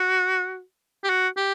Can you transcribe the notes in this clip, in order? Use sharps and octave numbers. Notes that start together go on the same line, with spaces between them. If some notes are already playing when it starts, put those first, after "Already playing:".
Already playing: F#4
G4
F#4
G4